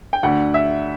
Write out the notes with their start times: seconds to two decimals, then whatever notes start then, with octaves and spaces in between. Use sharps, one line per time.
0.13 G5
0.23 D2 D3 F#5
0.54 E5